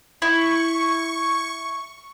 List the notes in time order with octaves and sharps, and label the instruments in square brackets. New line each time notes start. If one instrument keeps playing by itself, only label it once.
[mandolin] E4 [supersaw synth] C#6